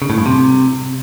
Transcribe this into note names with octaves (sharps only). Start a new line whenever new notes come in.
C#3
A2
G2
C3